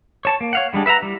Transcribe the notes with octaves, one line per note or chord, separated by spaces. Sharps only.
C#5 A5 C#6
A#3
C#5 F5 F#5
D3 G3 G#3 D4
B4 E5 F#5 A#5
G3 E4